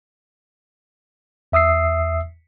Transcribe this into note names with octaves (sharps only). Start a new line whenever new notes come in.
E2 E5 D#6 E6 C7